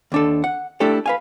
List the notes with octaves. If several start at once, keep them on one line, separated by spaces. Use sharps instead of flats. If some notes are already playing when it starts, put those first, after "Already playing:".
D#2 D4 A4
F#5
A3 D4 E4 G4 A4
B4 F5 G#5